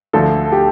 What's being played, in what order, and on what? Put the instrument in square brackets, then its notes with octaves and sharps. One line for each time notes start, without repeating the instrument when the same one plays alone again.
[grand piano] D2 D3 F3 A4
G4